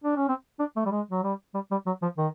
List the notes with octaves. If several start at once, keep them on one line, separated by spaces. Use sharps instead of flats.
D4
C#4
C4
D4
A3
G3
G#3
F#3
G3
G3
G3
F#3
F3
D#3